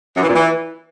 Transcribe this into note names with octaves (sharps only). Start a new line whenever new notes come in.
F#2
E3
A#2
E3